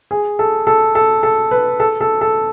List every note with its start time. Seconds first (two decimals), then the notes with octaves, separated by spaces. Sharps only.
0.11 G#4
0.39 A4
0.67 A4
0.95 A4
1.23 A4
1.51 B4
1.80 A4
2.01 A4
2.21 A4